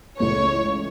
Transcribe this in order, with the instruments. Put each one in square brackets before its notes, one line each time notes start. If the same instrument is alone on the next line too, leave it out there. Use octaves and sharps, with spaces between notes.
[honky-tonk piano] C#2 C#3 E3 A3 [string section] C#5